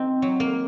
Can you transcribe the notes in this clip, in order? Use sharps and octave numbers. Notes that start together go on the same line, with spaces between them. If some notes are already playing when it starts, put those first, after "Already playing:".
Already playing: C4 D#4
F#3
A#3